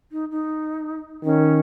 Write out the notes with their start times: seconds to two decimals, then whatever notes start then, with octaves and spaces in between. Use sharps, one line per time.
0.12 D#4
0.31 D#4
1.24 D#3 C#4